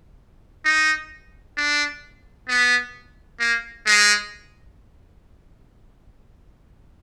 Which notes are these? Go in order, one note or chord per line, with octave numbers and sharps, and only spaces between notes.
D#4
D4
B3
A#3
G#3